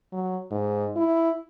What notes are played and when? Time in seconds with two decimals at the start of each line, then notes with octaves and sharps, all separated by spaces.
0.12 F#3
0.51 G#2
0.96 E4